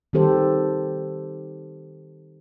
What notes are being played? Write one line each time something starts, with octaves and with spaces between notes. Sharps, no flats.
D#3 G3 C4 G4 A4 C5